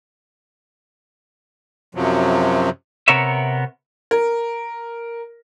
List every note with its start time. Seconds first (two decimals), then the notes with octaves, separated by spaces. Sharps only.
1.95 F#2 C3 F3 F#3
3.08 C3 B3 A#4 C#5 E5
4.11 A#4